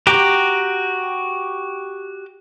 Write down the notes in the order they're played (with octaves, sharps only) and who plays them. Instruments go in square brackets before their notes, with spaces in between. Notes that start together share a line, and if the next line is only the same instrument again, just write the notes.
[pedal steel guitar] F#4 G4 G5 A#5 D6